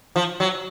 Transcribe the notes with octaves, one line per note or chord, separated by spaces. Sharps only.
F3
F#3